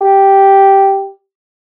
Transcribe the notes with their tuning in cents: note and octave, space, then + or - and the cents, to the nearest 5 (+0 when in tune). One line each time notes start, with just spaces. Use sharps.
G4 -5